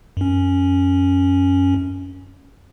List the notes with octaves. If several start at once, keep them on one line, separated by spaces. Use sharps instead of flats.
F#2 C#4